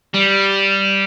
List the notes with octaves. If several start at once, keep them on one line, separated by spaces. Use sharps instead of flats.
G3